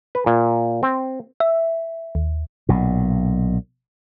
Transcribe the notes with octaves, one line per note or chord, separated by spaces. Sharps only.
B4
A#2
C4
E5
D#2
B1 A#2